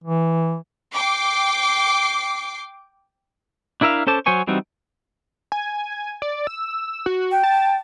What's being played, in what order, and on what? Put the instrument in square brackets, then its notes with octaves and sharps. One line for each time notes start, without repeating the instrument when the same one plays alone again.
[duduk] E3
[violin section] G5 D6 C7
[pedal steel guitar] D4 E4 A#4 E5 F5
C#4 A4 C5 A5 D6
F#3 C5 C#5 G#5 C#6
E3 G3 C4 D#4 F#4
[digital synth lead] G#5
D5
E6
F#4
[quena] G5
[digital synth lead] A5